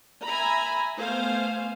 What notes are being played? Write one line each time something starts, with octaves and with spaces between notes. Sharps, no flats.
E5 G#5 A#5 B5
A3 B3 C5 F5 G#5